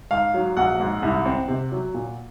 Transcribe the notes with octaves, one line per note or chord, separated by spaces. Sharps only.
G#2 F5
F#3
A#1 F#5
G#2
C2
C4
C3
F#3
A#2